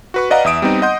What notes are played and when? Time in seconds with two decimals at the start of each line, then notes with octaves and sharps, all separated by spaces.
0.14 F#4 B4 C#6
0.30 B4 D5 D#5 F5 F#5 A#5
0.45 E2 E5 D#6 D7 E7
0.62 G3 B3 C4 D#4
0.82 D#5 F#5 C6 G6